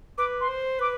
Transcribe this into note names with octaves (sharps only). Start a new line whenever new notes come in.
B4 D6
C6
C5
B4 D6